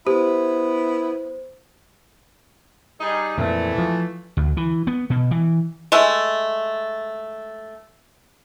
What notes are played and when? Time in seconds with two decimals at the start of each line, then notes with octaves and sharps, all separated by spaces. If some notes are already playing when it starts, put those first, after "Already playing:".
0.07 B3 E4 G4 C5
3.01 G3 D#4 G#4
3.38 F2 A#2 E3 A3
3.78 F3
4.37 D2
4.57 E3
4.87 B3
5.10 B2
5.31 E3
5.92 G#3 A3